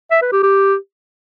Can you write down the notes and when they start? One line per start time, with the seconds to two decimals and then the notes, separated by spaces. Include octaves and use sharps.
0.11 E5
0.22 B4
0.32 G4
0.43 G4